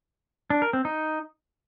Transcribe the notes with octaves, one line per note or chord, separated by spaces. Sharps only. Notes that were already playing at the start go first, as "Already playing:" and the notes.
D4
A#4
C4
D#4